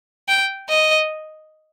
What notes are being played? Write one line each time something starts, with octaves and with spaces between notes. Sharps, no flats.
G5
D#5